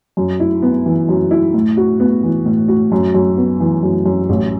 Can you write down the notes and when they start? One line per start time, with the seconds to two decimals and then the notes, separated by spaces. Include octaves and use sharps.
0.17 F#2
0.40 E4
0.62 B3
0.86 E3
1.09 F#2
1.31 E4
1.54 A2
1.77 F#4
2.00 B3
2.23 E3
2.46 A2
2.68 F#4
2.92 F#2
3.14 F#2
3.37 B3
3.60 E3
3.83 F#2
4.06 F#2
4.29 A1